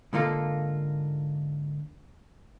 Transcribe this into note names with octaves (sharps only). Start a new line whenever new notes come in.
G#2 D3 A#3 F4 A4